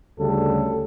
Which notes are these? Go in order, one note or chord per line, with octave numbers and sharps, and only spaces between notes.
D2 C#3 G3 A4